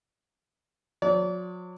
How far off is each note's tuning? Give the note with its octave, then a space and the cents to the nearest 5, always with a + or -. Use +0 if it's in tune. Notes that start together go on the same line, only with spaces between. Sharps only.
F#3 -40 D5 -35